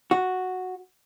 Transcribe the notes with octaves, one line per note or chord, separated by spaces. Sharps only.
F#4